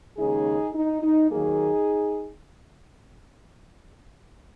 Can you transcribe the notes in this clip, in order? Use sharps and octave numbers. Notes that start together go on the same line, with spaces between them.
D#2 C#3 G#3 D#4 G#4
D#4
D#4
D#2 D#3 F#3 A#3 D#4 G#4